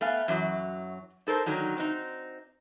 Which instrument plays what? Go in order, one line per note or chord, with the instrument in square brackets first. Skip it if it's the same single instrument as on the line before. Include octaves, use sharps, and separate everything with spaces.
[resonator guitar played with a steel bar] A3 B3 F5 G#5
F#2 E3 F#3
D#4 A4 A#4 C5
D3 D#3 F#3 D#4
C4 D#4